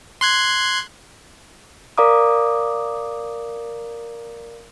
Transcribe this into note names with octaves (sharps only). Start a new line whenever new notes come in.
C6 F#6 G#6
A#4 D5 F5 A#5 D6 D#6